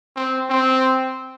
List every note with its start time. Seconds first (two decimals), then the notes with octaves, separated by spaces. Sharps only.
0.16 C4
0.50 C4